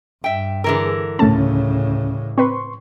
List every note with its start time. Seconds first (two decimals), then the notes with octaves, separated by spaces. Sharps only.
0.24 G2 E5 G5
0.64 D3 E3 G#4 A#4 B4 E6
1.19 D2 A2 C#3 A3 C#4 A5
2.38 C4 B4 C6 C#6